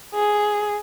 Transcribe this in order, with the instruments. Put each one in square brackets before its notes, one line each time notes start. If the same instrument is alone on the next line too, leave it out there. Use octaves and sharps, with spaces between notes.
[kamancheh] G#4